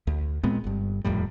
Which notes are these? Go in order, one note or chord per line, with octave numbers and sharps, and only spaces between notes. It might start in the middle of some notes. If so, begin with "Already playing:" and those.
D2
A#2 G#3 B3 C4
G1 G2
D#1 F2 A2 G3